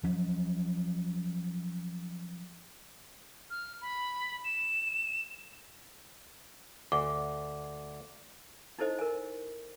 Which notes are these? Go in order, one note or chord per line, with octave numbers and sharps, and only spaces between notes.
F3 F#3 C#4
F6
B5
E7
D2 D6
D#4 E4 A4 C5 D#5
A#4 G#5